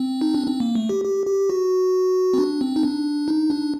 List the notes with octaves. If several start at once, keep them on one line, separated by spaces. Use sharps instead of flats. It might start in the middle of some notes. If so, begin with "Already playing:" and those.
Already playing: C4
D#4
D4
C4
A#3
A3
G4
G4
G4
F#4
C4
D4
C4
D#4
D4
D#4
D4